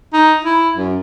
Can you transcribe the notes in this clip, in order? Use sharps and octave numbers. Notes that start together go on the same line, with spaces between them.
D#4
E4
F#2